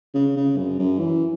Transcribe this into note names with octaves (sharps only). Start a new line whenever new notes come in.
C#3
C#3
F#2
F#2
E3